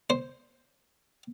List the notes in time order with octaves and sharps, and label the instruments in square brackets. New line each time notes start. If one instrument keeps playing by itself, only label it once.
[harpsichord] C5